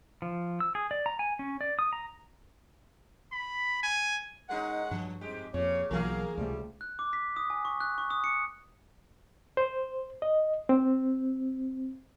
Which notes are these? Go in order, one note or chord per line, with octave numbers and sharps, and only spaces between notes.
F3
E6
G#4
D5
A#5
G#5
C#4
D5
D#6
A#5
B5
G#5
G#3 C#4 D#4 A#4 F#5
G2 F3
F2 G#2 G#3 G4
F2 A#2 C#3 G4 C#5
B1 E3 F#3 A#3 G#4 A#4
C#2 C3 F3 G3 A3
F#6
D6
B6
D#6
G#5
C#6
F#6
C#6
D#6
C#7
C5
D#5
C4